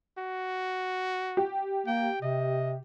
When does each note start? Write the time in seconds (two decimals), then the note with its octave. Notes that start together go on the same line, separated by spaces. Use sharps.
0.18 F#4
1.37 G4
1.86 A#3 G5
2.22 C3 D#5